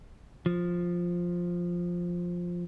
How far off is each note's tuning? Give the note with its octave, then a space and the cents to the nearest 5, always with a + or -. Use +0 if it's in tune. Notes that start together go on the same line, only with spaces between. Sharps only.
F3 +5